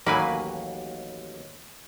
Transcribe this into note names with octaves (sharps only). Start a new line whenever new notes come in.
A1 D#2 F#3 A#3 B4 G#5